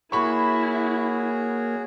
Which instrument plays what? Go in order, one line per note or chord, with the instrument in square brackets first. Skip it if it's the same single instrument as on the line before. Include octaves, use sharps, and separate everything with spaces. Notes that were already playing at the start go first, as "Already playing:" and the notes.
[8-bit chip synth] A#3 A#4 C#5 [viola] E4 [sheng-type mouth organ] F#4 G#4 [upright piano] B5 C#6